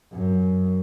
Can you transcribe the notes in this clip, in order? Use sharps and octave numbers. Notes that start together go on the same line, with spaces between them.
F#2